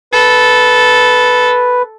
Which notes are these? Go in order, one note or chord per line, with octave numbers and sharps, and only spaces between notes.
A4 B4